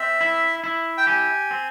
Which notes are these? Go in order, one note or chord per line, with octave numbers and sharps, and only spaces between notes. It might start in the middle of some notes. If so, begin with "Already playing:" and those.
Already playing: C4 E5
E4
E4
G5
G4 G#5
C4